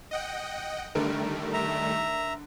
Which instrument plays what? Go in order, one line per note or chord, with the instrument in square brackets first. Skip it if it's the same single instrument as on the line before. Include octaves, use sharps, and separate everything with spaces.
[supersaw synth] D#5 F#5 G5
[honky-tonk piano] D3 A#4 [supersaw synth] D#3 G3 A3
[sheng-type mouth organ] E5 A#5